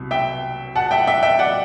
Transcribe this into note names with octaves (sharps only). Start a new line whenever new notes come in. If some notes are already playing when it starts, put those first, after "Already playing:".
Already playing: C2 B2
E5 G5
F#5 A5
E5 G5
E5 G5
E5 G5
D5 F#5